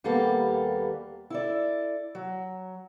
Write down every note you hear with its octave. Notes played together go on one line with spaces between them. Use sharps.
D#2 G3 A#3 B3 A4
E4 A4 D5
F#3